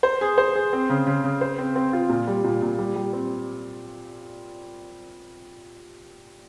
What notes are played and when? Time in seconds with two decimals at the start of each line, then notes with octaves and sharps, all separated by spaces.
0.03 C5
0.21 G#4
0.38 C5
0.55 G#4
0.73 C4
0.90 C#3
1.07 C#3
1.24 C#3
1.41 C5
1.58 C4
1.76 C4
1.93 F4
2.09 A#2
2.27 G3
2.44 A#2
2.62 A#2
2.79 G3
2.96 G3
3.13 C4